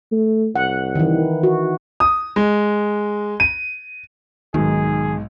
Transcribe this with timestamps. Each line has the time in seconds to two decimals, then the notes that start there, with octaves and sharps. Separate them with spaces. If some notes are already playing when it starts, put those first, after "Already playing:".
0.12 A3
0.56 C2 F#5
0.95 D#3 E3
1.43 F#4
2.00 D#6
2.36 G#3
3.40 D#7
4.54 B1 G#2 D#3 G#4